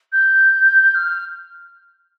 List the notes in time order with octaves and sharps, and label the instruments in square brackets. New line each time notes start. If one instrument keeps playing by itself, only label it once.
[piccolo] G6
F6